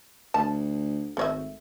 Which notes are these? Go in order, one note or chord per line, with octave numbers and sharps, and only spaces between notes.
D2 A5
G#1 A3 C#5 E5